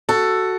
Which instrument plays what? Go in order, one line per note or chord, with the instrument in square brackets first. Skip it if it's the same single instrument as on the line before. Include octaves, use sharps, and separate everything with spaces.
[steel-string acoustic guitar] F#4 [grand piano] A4